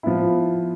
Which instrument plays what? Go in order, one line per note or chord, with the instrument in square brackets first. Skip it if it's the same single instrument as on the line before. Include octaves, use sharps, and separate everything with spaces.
[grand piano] F3 B3 E4